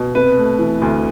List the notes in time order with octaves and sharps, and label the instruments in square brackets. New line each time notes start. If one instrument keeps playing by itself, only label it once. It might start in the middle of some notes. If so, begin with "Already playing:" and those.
Already playing: [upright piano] B2
C3 B4
A3
E3
D2